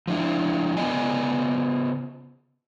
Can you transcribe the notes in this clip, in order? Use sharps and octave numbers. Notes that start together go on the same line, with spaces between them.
F3 D4 E4
C#3 B3 B4 D5 D#5 G#5